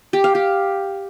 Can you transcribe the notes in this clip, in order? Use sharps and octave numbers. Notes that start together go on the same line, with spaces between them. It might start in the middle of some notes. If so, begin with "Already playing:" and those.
G4
F5
G4